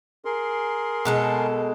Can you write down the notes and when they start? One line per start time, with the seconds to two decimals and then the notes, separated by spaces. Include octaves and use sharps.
0.25 G#4 A#4 C6
1.05 B2 G#3 A4